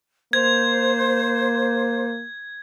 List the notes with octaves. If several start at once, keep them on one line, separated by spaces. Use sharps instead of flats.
A#3 C5 G#6